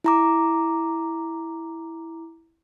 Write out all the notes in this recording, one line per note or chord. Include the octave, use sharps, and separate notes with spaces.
E4 A#5 D6